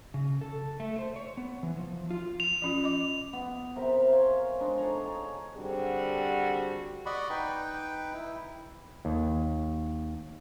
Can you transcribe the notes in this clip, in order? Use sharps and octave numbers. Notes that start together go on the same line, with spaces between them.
C#3
A4
A3
C5
C#5
B3
E3
F3
F4
F7
F3 C#4 F4
D#5 D6
B3
C3 A#4 E5 G5
C5 C#5 F5 G#5
G#3 D4 D#4
G#4 A4 C#5 A#5
G#4
D3 G3 C4 F#4 G#4 C5
D5 D#5 F#5 B5 C#6
D#4 B4 G5
E4
D#2